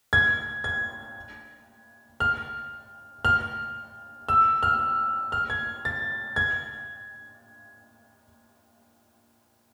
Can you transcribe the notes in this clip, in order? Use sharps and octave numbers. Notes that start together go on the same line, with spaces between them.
G#6
G#6
F6
F6
E6
F6
F6
G#6
A6
G#6